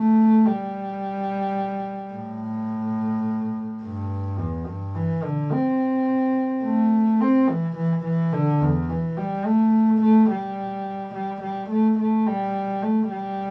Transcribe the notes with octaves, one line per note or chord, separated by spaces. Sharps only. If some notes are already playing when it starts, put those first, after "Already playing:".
Already playing: A3
G3
A2
G2
E2
G2
E3
D3
C4
A3
C4
E3
E3
E3
D3
E2
E3
G3
A3
A3
G3
G3
G3
A3
A3
G3
A3
G3